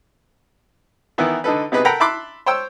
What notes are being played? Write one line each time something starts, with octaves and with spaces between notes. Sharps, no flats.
D#3 E3 B3 E4
D3 D#4 A4 B4
C3 B3 D#4 G#4 B4
A4 A#4 F#5 G5 A#5 B5
E5 A5 B5 C6 D6 F#6
C5 C#5 G5 E6